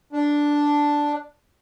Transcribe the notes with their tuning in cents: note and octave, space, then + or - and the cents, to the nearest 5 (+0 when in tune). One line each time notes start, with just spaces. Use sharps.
D4 -5